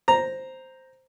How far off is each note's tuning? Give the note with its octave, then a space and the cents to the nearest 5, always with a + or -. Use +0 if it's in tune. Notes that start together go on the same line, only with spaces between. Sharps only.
C5 +0 A#5 +0